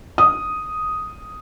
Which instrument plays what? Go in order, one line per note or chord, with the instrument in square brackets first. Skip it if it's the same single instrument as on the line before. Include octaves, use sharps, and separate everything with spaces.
[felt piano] D#6